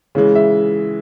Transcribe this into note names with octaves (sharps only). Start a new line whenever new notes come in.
C#3 E3 G#3
E5